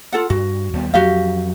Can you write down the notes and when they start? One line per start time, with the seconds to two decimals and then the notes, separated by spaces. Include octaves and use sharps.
0.12 F4 A4 F#5
0.30 G2 F#4
0.73 D#2 G3 B3
0.94 F2 F#3 F#4 G4 F5